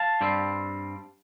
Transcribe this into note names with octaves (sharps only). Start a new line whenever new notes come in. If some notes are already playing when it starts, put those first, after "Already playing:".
Already playing: F5 A5
G2 G3 C4